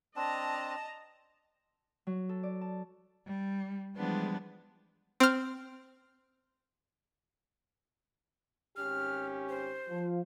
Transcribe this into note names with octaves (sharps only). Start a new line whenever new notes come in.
C4 D4 D#5 A5 A#5
F#3
A4
D5
A5
G3
E3 F3 G3 G#3 B3 D4
C4 F6
G#1 C#4 G4 F6
C5
F3